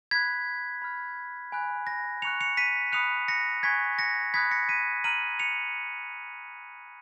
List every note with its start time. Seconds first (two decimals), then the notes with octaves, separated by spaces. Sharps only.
0.11 B5 F#6 G#6 B6
0.82 B5 F6
1.52 G#5 B5 F#6
1.87 A#6
2.22 A#5 C#6 F#6 C#7 F7
2.41 C#7 F7
2.57 B6 D#7
2.92 B5 D#6 F#6 C#7 F7
3.28 A#6 C#7
3.63 G#5 C#6 F#6 G#6 B6
3.99 A#6 C#7
4.34 B5 D#6 F#6 G#6 B6
4.51 A#6 C#7
4.69 B6 D#7
5.04 A#5 F6 D#7 F#7
5.39 C#7 F7